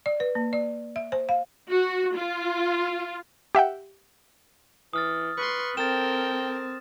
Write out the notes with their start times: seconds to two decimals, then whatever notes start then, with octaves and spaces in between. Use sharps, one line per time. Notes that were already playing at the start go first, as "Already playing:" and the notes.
0.06 D5
0.20 B4
0.35 A#3
0.53 D5
0.96 E5
1.12 C5
1.29 F5
1.70 F#4
2.15 F4
3.55 G4 E5 F#5 G5
4.93 E3 D#6 F6 A6
5.37 B4 C6 C#6
5.77 C4 A4 A#4 G5 A6 E7